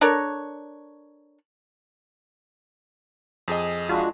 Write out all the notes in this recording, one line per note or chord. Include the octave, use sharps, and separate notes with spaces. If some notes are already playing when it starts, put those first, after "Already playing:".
D4 A4 A#4 C#5
F2 G#4 D#5
G#3 D4 F4 F#4